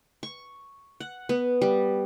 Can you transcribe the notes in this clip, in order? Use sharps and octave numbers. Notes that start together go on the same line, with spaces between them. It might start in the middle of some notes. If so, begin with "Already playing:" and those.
C#6
F#5
B3
G3